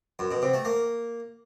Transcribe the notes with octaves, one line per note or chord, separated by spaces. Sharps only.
F#2
B2
C3
A3
A#3